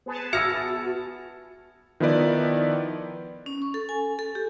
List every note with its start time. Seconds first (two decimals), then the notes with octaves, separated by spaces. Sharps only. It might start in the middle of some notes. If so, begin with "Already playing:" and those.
0.06 B3 G#4 A5
0.33 F#4 E5 E6 F6 G#6 A#6 C#7
2.00 D#3 F3 B3 E4 B4 D5
3.46 C#4
3.62 C#6
3.74 A4
3.89 G#5
4.19 A4
4.35 G4